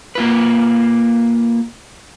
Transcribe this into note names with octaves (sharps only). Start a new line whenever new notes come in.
A#3 F4 B4